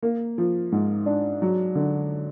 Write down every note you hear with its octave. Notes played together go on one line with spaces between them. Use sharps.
A#3
F3
G#2
D4
F#3
D3